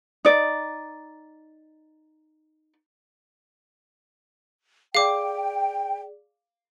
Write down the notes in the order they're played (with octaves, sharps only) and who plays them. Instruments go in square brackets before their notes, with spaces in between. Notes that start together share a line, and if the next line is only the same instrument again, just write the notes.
[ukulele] D#4 D5
[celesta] G#4 D5 [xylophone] F5 D6 [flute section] G5